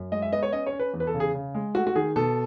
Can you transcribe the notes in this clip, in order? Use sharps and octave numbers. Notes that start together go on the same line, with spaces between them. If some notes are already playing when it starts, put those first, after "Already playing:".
Already playing: F#2
G#3 D#5
E5
B3 D#5
C#5
C#4 D#5
C#5
C#4
B4
E2
B4
A4
C#3
G#4
C#3
G#3
A3 F#4
F#4
D#3 G#4
B2 A4